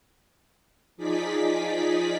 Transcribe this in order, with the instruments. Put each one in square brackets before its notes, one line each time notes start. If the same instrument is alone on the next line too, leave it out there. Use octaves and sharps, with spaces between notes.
[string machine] F3 D#4 G#4 D5 B6